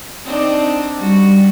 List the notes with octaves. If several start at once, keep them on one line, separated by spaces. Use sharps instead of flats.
C4 D4 D#4
G3 F#4